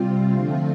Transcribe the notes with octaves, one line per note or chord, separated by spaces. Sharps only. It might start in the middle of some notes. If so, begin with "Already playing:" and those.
Already playing: C3 G3 C4 F4
D3 F3 A3 C4 F4